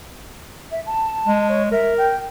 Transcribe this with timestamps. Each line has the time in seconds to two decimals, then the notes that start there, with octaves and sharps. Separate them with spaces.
0.72 E5
0.86 A5
1.28 G#3
1.49 C#5
1.72 A#4 E5
1.98 G5